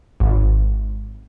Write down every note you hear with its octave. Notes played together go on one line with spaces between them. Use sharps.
G#1